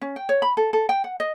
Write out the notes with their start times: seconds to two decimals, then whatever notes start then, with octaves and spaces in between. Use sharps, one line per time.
0.02 C#4
0.16 G5
0.29 C#5
0.42 B5
0.57 A4
0.73 A4
0.89 G5
1.04 F#5
1.20 D#5